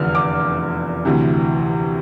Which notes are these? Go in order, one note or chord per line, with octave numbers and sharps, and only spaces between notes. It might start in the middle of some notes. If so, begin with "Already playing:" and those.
Already playing: F1 E2 D3 F3 F6
D6
D2 C3 E3